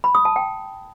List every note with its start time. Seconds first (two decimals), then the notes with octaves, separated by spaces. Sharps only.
0.04 B5
0.15 D#6
0.25 A5
0.36 G5